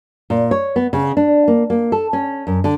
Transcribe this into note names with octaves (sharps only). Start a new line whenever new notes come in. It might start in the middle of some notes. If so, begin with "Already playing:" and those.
A#2
C#5
B3
C#3
D4
A#3
A#3
A4
C#4
F#2
D3